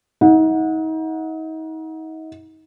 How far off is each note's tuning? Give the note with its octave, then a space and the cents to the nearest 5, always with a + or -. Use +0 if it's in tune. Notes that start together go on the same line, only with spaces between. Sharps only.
D#4 +35 F#5 -25